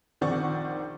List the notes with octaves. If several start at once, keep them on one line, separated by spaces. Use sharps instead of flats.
A#1 D#3 C4 D5 F#5 C#6